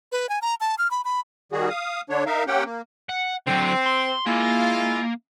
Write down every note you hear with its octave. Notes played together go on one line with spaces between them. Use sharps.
B4
G#5
A#5
A5
F6
B5
B5
D#3 G3 F#4 G#4
F5 D#6
D3 D4 C#5
D#4 A#4 E5 F5
A#3 C#4 G4 F#5 G5
A#3
F#5
D3 F#3 C4
C6
G#3 A#3 E4 F4